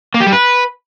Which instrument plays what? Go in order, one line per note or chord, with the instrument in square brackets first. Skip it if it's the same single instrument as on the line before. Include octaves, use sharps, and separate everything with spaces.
[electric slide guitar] A#3
G4
G3
B4